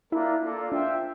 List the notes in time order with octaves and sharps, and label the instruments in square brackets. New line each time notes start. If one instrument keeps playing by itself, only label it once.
[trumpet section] A#3 D4 F4 A#4 E5 [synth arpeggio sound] E4
[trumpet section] A#3 F4 A4 D5
[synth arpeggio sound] D4 [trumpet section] F4 C5 E5 G5